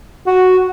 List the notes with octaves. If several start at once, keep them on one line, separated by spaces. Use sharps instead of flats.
F#4